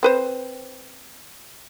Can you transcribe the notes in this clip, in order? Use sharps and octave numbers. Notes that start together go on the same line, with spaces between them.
C4 B4 C5